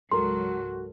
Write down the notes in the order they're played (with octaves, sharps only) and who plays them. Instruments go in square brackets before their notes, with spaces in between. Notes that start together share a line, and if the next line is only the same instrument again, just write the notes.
[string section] C#2 G#2 F#3 [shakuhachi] F#4 [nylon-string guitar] A4 A#4 [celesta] C6